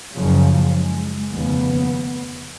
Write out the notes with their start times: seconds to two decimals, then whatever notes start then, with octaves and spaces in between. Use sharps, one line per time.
0.16 F#1 F#2 C#3 F3
0.74 G#3
1.33 F1 D#2 C#3 B3